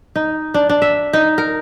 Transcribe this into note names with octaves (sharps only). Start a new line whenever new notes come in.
D#4
D4
D4
E5
D#4
A#4